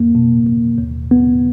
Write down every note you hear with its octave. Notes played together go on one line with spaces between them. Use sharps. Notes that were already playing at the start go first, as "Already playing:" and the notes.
Already playing: F2 A#3
B2
B2
D#2
B3